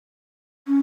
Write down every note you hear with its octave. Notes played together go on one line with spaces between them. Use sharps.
C#4